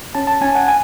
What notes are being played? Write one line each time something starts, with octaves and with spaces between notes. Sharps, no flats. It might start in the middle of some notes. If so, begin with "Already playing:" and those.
C#4 A5
A5
C#4 G#5
F#5
G#5